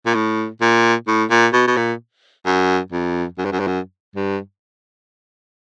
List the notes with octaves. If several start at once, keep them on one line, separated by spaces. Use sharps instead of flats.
A#2
A2
A#2
A2
A#2
B2
B2
A#2
F#2
F2
F#2
G2
F#2
G2
F#2
G2